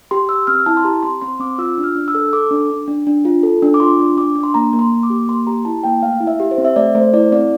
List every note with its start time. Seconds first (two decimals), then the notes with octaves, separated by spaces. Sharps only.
0.11 G4 C6
0.29 G4 E6
0.47 C4 F6
0.66 E4 A5
0.77 C6
0.84 G4 A#5
1.03 C4 C6
1.21 C4 C6
1.40 C4 D6
1.58 F4 E6
1.78 D4
1.84 F6
1.96 D4
2.08 E6
2.15 A4
2.33 A4 D6
2.51 D4
2.70 D4
2.88 D4
3.07 D4
3.25 F4
3.43 A4
3.62 D4
3.74 D6
3.80 F4 C6
3.99 D4
4.17 D4 D6
4.35 D4
4.43 C6
4.54 A#3 A#5
4.73 A#3
4.79 C6
4.92 A#3
5.03 D6
5.10 G4
5.28 A#3 C6
5.47 G4 A#5
5.65 E4 A5
5.83 A#3 G5
6.02 A3 F5
6.20 E4
6.27 E5
6.40 G4
6.51 C5
6.58 C4
6.65 E5
6.76 A3 D5
6.95 A3 C5
7.13 E4 D5
7.32 C4 D5